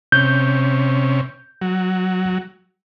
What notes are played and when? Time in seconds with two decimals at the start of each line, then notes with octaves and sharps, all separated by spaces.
0.12 C3 C#4 G6
1.61 F#3